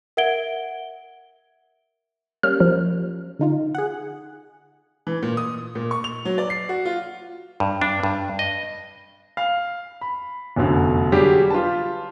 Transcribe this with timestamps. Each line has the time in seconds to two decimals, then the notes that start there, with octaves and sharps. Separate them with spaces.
0.17 A#4 E5 F#5 G#6 D7 G7
2.43 G3 A#3 C#4 F6
2.60 F3
3.39 D3 D#4 F4
3.75 G#4 F#5
5.07 E3
5.23 A#2
5.37 D#6
5.75 A#2
5.91 C#6
6.04 F7
6.25 F#3
6.38 D5
6.50 C7
6.69 F#4
6.85 F4
7.60 G2
7.81 D4
8.03 G2
8.39 D#5
9.37 F5
10.01 B5
10.56 F1 F#2 B2 D3 F#4
11.12 D3 F#3 G3 G4 G#4
11.50 F4 B4 A5